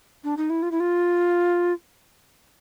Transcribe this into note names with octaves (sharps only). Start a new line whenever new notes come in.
D4
D#4
E4
F4
E4
F4